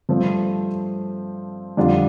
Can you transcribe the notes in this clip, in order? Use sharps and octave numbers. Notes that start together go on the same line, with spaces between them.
G2 F3 A3 C4
F2 D3 G3 D4 F4